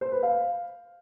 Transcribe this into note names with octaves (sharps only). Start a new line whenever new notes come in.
C5
B4
F5